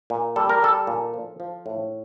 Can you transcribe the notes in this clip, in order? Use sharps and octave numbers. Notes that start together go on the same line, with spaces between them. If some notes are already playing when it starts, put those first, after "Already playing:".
A#2
G3 A4
A#4
G3 A4
A#2
F3
F3
A2